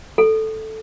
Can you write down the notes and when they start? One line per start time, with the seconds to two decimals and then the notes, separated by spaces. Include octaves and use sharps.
0.18 A4